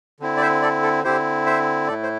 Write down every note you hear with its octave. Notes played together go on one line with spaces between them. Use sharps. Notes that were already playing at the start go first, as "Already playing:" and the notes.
D3 C4 E4
D5
C5 E5
A4 D5
A4
D3 C4 E4 G4 C5
C5 E5
A2 A3 E4 A4 D5
C5